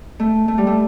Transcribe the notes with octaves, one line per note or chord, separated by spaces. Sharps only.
A3
A3
G3
A3